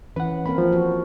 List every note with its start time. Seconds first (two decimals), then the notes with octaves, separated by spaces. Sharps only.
0.16 E3 C#4 B4 F#5
0.46 A#3 C4 A#4 B5
0.58 F3
0.72 F#4